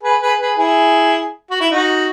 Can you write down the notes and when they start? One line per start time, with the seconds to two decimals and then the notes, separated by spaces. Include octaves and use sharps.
0.03 G#4 B4
0.22 G#4 B4
0.40 G#4 B4
0.58 E4 G#4
1.51 F#4
1.60 E4
1.71 D#4 F#4